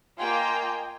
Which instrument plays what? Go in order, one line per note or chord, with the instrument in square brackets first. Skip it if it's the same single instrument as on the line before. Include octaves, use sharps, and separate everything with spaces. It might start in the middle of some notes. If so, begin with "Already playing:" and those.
[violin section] A#3 F4 G5 [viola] D#5 G#5